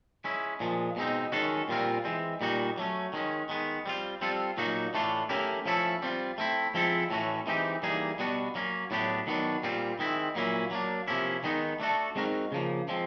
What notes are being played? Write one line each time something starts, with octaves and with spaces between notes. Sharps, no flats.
G#3 C#4 E4
A#2 F3 G#3
B2 G#3 C4 D#4
D#3 G#3 C#4 F#4 A4
A#2 G3 C4 F4 A#4
E3 G#3 C4
A#2 G3 A#3 D#4 F#4
F#3 A3 C#4
D#3 G#3 C#4
D#3 G#3 B3
G3 C4 F4
G3 C4 F4 A4
A#2 F#3 A#3 D#4 F#4
A2 E3 A3 D4 F4
A3 C#4 E4 G4 A#4
F3 A3 C#4 E4 A4
G3 C4 F4
A3 C4 E4
F3 G#3 C4 E4 A4
A2 E3 A3 C#4 F#4
E3 G#3 C4 D#4 G4
E3 G3 A#3 D#4 G#4
B2 G3 B3 D4 F#4
F#3 A#3 C#4
A2 F#3 B3 D4 G4
D#3 F#3 B3 D4
A#2 G3 C4 F4
D#3 G#3 C4 E4
A#2 F#3 A#3 C#4 E4
F#3 A#3 D4
C3 F3 A#3 C#4 E4
D#3 G#3 B3 D#4
A3 D4 F#4 A4
G#3 C4 D#4 F#4 A#4
C#3 F3 A#3
F3 G#3 C4